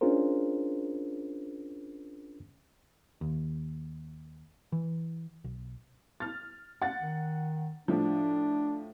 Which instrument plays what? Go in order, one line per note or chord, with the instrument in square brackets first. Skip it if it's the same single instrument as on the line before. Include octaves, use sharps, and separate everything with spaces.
[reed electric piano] C#4 D4 F4 G#4 A#4 C5
[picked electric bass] D#2
E3
B1
[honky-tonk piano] F6 A6
F#5 A6
[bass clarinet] D#3
[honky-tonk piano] A2 F3 [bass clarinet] D4